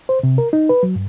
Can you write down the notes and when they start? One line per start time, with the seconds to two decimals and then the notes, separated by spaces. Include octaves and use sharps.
0.09 C5
0.23 C3
0.38 A#4
0.53 D#4
0.69 B4
0.83 F#3
0.96 G2